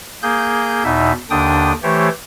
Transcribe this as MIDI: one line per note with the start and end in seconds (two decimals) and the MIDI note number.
0.22 0.83 58
0.22 0.83 68
0.22 0.83 91
0.84 1.12 40
0.84 1.12 47
0.84 1.12 63
0.84 1.12 76
1.30 1.72 39
1.30 1.72 50
1.30 1.72 62
1.30 1.72 79
1.30 1.72 87
1.83 2.09 52
1.83 2.09 57
1.83 2.09 67
1.83 2.09 72
1.83 2.09 73